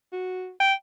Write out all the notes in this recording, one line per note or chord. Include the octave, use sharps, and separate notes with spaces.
F#4
G5